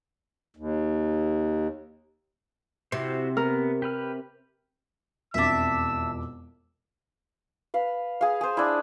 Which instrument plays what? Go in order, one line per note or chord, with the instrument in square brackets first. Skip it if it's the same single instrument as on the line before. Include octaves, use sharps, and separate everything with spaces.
[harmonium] D#2
[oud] C3 [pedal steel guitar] E4 F#4 C5
[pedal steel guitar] B3 [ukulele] A#4
[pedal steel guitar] G4 B4 F6
[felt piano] E1 F2 D6 [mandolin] D4 E5 [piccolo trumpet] E6
[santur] B4 F5
G#4 F5
G#4 C5
D4 E4